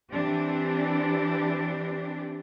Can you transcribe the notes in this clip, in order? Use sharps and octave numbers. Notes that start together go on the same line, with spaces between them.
E3 C4 D4 G4